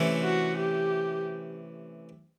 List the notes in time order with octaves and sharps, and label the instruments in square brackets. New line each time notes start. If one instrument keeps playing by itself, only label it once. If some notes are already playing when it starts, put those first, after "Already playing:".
Already playing: [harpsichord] C3 E3 A3 C#4 E4
[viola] F#4
G4